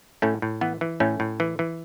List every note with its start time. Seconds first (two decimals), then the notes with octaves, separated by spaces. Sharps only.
0.22 A2 A3 C#4
0.42 A2
0.61 E3 B3
0.81 E3
1.00 A2 A3 C#4
1.20 A2
1.40 E3
1.59 E3